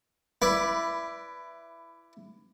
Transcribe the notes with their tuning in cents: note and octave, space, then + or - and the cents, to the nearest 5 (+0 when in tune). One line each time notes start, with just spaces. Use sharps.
E4 +15 B4 +0 D5 +0